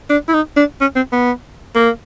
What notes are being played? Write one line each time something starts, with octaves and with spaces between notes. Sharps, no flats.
D4
E4
D#4
D4
C#4
C4
B3
A#3